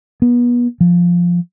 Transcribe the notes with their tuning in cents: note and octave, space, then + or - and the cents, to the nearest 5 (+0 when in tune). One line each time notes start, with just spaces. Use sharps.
B3 -30
F3 +0